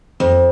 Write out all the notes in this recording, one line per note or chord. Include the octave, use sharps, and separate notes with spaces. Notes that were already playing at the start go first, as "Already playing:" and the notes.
F2